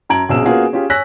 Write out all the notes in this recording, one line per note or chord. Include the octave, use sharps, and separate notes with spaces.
F#2 A5 A#5 G#6 D7 F#7
A#1 B2 C#4 G#4 E6 E7
A#3 B3 C#4 F4 F#4 G#4
C#4 F4 G4 G#4
C#5 G#5 E6 F#6 A#6 B6